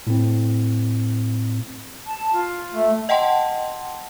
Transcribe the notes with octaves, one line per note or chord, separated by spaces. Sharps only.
A2 C4
A5
F4
A3
D#5 F#5 G5 A5 C6